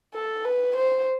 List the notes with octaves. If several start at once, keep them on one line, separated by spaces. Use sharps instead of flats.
A4
B4
C5